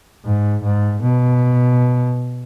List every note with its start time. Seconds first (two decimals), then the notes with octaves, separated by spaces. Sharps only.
0.25 G#2
0.62 G#2
1.02 B2